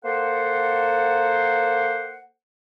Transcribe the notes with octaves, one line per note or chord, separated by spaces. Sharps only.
A#3 A4 C5 F#5